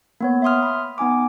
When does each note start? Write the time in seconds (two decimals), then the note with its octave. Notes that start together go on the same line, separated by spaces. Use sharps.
0.20 A#3 B3 C#5
0.42 E5 F5 C6 D#6 F6
0.63 B5
0.98 B3 D#4 G#5 D6